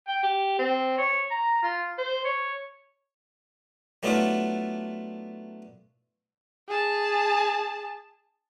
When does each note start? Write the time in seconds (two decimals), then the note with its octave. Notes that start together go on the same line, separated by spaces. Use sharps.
0.08 G5
0.23 G4
0.59 C4
0.98 C#5
1.30 A#5
1.63 F4
1.98 C5
2.25 C#5
4.03 F#3 A3 B3 D4 E4 F4
6.69 G#4 A5